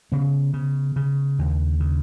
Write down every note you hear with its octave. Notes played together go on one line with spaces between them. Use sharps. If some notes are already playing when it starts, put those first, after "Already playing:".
C#3 B3
C#3
C#3
D#2
C#3